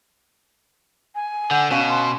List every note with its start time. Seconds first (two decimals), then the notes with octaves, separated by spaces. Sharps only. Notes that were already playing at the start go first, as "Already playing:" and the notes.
1.15 G#5
1.51 D3 F#5 D6 E6 G6
1.71 B2 C#4 C#5 F5 E7
1.89 C6